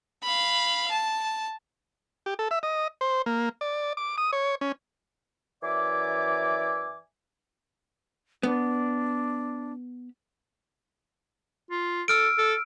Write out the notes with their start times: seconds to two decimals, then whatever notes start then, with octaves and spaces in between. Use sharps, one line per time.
0.23 F5 B5
0.91 A5
2.26 G4
2.39 A4
2.51 E5
2.63 D#5
3.01 C5
3.26 A#3
3.61 D5
3.97 D6
4.18 D#6
4.33 C#5
4.61 C#4
5.63 F#2 E3 D5 E5 G#5 D6
8.43 B3 D4
11.71 F4
12.08 A4 E6 F6 D7
12.38 A4